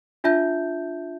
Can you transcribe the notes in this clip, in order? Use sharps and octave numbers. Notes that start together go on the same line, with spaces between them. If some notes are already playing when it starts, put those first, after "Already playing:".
D4 F4 E5 A5 G6